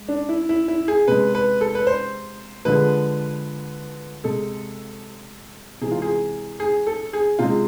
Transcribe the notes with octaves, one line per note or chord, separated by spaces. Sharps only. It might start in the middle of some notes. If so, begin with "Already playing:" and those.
Already playing: G#3
D4
E4
E4
E4
G#4
C3 G#3 B4
B4
A4
B4
C5
D3 F3 G#3 B4
C3 G#3 A4
C3 E3 G#3 G#4
F4
G#4
G#4
A4
G#4
C3 G#3 F4